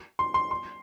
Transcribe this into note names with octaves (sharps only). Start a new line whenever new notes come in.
C6
C6
C6